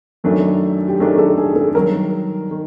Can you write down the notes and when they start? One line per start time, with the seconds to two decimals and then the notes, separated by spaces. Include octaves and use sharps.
0.24 F#2 D#3 F#3 A3 D4 F#4
0.88 G4
0.99 F#2 D#3 F#3 A3 D4 G#4
1.18 A4
1.38 G#4
1.56 A4
1.75 G2 D#3 F#3 A#4
2.51 D#3